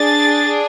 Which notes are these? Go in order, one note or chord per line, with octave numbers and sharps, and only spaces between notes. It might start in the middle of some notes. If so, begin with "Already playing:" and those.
Already playing: D4 G#4 A6